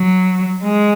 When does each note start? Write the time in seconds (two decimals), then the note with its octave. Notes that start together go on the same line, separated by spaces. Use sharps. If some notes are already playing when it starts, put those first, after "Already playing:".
Already playing: F#3
0.63 G#3